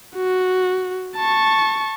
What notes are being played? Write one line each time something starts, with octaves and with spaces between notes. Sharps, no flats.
F#4
A5 C#6